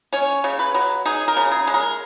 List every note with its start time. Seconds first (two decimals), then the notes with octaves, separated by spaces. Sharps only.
0.13 C#4 C#5
0.44 C#3
0.59 B4
0.75 F#3
1.06 D#4 G#4
1.28 A#4
1.37 C#3
1.51 G#4
1.67 G#3
1.74 A#4